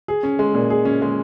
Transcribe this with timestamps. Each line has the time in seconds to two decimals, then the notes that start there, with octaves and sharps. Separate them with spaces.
0.08 G#4
0.23 C#4
0.39 G#3
0.54 A#2
0.70 G#4
0.85 C#4
1.02 G#3